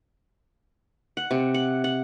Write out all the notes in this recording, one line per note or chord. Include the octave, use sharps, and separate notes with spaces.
F#5
C3
F#5
F#5